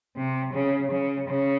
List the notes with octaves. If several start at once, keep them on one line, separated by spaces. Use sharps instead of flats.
C3
C#3
C#3
C#3